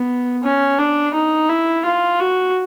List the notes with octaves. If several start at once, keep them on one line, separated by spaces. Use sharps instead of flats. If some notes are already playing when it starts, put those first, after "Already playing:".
Already playing: B3
C#4
D4
D#4
E4
F4
F#4